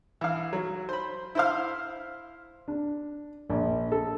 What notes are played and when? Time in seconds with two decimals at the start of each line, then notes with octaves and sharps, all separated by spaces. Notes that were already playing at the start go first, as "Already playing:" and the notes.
0.21 E3 F5
0.53 F#3
0.89 C5 B5
1.35 E4 C5 F5
2.68 D4
3.50 A#1
3.92 A4